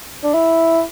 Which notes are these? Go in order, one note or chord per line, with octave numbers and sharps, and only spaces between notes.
D4
E4